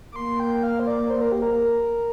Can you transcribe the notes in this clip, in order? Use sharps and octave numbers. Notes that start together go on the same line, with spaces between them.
D6
A#3 C6
G5
F5
C5
D5
C5
A#4
G4
A#4